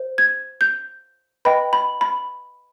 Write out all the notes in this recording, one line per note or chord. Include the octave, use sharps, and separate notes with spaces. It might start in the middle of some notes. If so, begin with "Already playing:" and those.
Already playing: C5
G#6
G6
B4 D#5 G5 B5
B5
B5